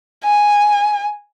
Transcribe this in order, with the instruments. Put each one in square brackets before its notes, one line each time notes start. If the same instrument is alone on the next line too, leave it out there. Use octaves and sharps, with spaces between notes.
[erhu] G#5